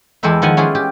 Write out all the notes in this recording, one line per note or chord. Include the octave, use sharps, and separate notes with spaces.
E2 G#3 G4 A4 B4 E5
D#3 F3 F#5 G#5
C#4 E4 F4 G4 G#4 B4
G4